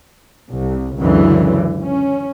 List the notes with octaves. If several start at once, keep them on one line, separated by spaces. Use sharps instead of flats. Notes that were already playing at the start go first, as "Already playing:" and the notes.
C2
C#2 F#2 D3 E3
C#4